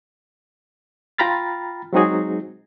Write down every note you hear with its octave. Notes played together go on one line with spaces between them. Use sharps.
F4 G5 A#5 B5 F6 A6
F#3 G#3 C4 D#4 F#4 G#4